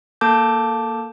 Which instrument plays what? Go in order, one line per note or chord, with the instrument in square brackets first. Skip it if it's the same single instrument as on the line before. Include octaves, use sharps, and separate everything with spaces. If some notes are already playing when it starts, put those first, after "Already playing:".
[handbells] A#3 A4 A5 D6 G6